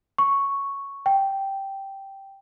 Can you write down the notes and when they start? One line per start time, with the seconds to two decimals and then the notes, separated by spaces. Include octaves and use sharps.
0.18 C#6
1.06 G5